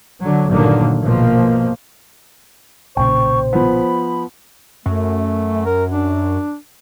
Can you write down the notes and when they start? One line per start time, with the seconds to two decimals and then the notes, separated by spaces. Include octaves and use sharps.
0.20 D3 F#3
0.50 G1 A#2 D3 D#3 F#3 A#3
1.01 A#1 B2 F3 A#3
2.97 B1 A#2 C#3 C5 G5 C#6
3.53 F3 B3 B5
4.86 F#2 A3
5.66 A#4
5.91 D4